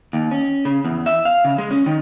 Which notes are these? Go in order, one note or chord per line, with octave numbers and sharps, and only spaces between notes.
D#2
C#4
C#3
E2
E5
F5
C#3
G#3
C#4
D#3